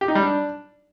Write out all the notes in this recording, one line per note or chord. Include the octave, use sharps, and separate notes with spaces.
G4
D#4
G3
D4